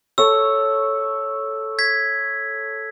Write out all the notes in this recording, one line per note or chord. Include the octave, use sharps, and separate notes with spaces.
A4 C#5 E6
G#6 B6